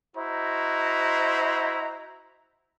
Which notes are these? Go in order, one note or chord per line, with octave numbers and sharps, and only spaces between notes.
E4 F#4 C5 D#5 A#5